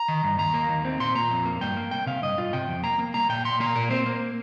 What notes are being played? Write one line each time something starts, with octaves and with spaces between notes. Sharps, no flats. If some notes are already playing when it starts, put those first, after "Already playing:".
Already playing: A#5
D#3
G2
D#2 A#5
A#3
D#2
C4
A#2 C6
A#2 A#5
F2
A#3
G2 G5
A#3
C2 G5
C3 F5
G2 D#5
G2 F4
C3 G5
F2
A#3 A#5
A#3
C2 A#5
A#2 G5
A#2 C6
A#3 A#5
A#2 A#4
C4 C5
A#3